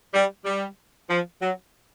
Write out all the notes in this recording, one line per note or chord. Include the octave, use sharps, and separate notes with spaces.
G3
G3
F3
F#3